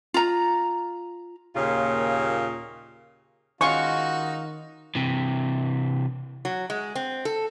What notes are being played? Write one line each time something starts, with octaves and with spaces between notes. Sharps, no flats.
F4 A#5
D#2 A#2 C#3 A#3 F4 C#5
D#3 G#3 C#4 D#4 F4 F#4 C#6
C3 E3
F#3
G#3
C4
A4